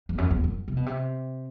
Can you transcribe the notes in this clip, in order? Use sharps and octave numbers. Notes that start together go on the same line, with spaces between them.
E2
F#2
E2
F#2
C3
B2
C3